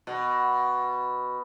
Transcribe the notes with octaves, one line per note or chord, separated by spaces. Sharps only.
B2